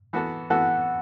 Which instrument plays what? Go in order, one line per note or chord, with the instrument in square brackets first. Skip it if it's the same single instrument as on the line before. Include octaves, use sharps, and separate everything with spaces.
[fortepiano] E3 B3 F#4 A4
[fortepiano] E3 B3 F#4 A4 [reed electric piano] F#5